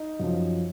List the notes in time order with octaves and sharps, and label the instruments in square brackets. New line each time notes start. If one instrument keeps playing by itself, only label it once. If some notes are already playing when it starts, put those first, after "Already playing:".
Already playing: [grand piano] D#4
F#2 F3